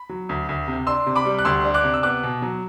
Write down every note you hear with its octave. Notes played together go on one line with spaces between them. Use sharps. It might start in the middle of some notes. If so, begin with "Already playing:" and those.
Already playing: B5
F#3
D2
D2
C3
D4 C6 E6
C3
B5 D6
G3
F#6
D2 C6 E6
D4
D6 F#6
C3
E6
B3 D6 F#6
B2
F#3